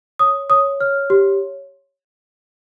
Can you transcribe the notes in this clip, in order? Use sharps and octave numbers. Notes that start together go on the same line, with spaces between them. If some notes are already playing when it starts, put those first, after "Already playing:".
C#5 D#6
C#5 D#6
C#5 F6
G4